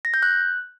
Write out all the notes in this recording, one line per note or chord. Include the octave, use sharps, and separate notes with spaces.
A#6
G6
F#6